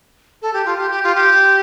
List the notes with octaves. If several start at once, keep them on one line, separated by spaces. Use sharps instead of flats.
A4
G4
F4
G4
G4
F4
G4